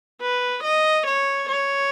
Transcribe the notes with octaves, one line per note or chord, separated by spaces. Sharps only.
B4
D#5
C#5
C#5